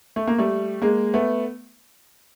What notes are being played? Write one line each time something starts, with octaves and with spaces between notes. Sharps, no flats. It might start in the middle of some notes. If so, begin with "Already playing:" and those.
A3
A#3
G3 A3
G#3 A#3
A3 B3